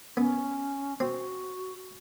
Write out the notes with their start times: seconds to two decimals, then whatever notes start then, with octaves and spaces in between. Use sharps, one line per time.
0.17 B3 C#4
1.00 C4 F#4